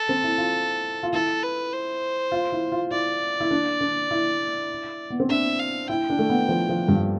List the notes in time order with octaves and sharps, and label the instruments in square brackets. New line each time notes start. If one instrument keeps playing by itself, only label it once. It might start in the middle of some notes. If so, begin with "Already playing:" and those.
Already playing: [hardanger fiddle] A4
[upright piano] C4
E4
F4
F4
[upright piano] E4 [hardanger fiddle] A4
[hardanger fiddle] B4
C5
[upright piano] F4
E4
F4
[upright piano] E4 [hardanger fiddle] D5
[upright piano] E4
D4
D4
E4
B3
C4
[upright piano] D4 [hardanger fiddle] E5
[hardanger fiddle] F5
[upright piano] E4 [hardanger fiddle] G5
[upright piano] D4
A3
B3
F3
F3
G2